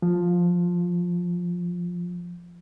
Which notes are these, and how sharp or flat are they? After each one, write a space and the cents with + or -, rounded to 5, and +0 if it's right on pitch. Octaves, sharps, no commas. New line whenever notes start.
F3 +10